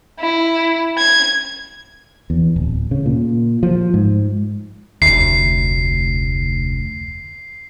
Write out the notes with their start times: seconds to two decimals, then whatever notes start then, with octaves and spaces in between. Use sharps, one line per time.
0.20 E4
0.98 G#6
2.30 E2
2.56 D1
2.91 C#3
3.06 A#2
3.63 F3
3.94 G#2
5.02 F1 D2 C7